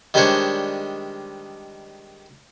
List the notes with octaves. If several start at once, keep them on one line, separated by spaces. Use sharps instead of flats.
D#3 G3 G#3 D4 C5 C#5